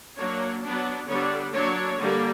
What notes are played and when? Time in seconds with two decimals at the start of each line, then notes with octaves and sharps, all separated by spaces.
0.17 F#3 A#3 D4 C#5
0.63 F#3 B3 D4
1.07 D3 G3 B3 D4 C#5
1.53 F#3 A#3 D4 C#5
1.97 D3 G3 A#3